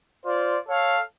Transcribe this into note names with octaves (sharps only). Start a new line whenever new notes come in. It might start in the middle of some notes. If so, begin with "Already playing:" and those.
F4 C5 D5
A4 C#5 F5